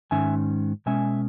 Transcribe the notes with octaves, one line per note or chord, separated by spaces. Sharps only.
G#2 D#3 G#3 C#4 E5 G#5
B2 G#3 C#4 E5 G#5